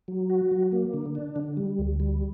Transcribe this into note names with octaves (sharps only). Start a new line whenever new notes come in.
F#3
F#4
F#3
A#3
D3
D4
D3
G3
D2
G3